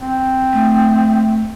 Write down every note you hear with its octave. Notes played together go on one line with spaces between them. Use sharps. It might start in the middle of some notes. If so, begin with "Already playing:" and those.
C4
A3